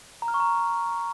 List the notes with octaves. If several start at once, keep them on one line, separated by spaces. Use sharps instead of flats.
A#5
F6
C#6
A#5